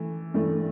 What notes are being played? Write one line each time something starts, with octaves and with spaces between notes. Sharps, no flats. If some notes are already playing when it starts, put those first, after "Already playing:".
Already playing: E3 A3
G2 E3 A3